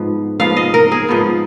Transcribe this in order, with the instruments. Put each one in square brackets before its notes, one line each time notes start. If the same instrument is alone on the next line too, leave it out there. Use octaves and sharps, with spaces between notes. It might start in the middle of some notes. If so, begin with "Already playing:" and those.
Already playing: [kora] G#2 F3 B3
G#2 F3 B3 F5
D#5
A#4
G#4
G#2 F3 B3